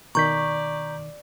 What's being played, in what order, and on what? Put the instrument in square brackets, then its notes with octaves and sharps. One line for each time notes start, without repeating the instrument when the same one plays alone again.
[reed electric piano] B2 D#3 [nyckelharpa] D5 [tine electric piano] A#5 G6 B6 [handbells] C#6